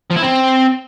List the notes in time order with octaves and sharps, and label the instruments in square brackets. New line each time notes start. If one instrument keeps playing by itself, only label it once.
[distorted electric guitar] F3
E4
C4